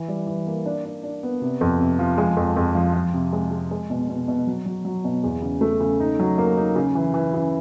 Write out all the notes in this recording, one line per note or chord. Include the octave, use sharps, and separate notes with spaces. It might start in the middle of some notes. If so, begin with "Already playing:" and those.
Already playing: E3
G3
E3
A#3
D4
D4
D4
B3
C3
F2
C3
F3
G#3
F2
F2
F3
F3
C3
G#3
G#3
G#3
B2
B2
B2
F#3
F#3
F#3
B2
E2
C#3
A3
C#3
D#4
F#3
A#3
D#4
C#3
E3
E3
C#3